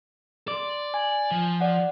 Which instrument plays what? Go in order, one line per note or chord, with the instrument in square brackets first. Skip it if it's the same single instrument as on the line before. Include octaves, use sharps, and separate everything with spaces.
[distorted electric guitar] D5 [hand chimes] C6 D6
[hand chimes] G#5
[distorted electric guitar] F3
[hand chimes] D5 F#5